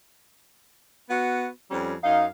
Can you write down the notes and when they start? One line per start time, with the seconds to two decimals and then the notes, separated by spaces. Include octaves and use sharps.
1.09 B3 F#4
1.70 F2 G3 C#4
2.03 F#2 D#4 F5